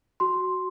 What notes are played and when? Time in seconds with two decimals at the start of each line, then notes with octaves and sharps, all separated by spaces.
0.20 F#4 C6